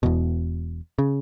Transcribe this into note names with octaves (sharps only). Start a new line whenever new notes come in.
E1 E2 B2
C#3